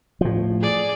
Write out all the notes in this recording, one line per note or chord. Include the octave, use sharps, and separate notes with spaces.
A2 F3
G#4 D5